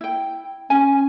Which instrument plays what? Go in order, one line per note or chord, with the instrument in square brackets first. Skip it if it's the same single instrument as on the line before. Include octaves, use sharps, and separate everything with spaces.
[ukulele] E4 G5
[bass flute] C#4 [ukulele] G#5